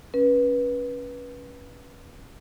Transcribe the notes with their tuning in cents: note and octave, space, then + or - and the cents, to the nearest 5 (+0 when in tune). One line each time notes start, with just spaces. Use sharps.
C#4 +0 B4 -25